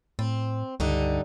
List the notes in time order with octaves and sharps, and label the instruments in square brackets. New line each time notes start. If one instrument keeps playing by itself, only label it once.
[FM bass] A2 [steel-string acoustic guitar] C4
[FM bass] C#2 [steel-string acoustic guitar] G2 D3 D#4